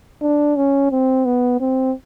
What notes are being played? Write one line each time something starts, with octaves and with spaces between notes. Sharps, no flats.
D4
C#4
C4
B3
C4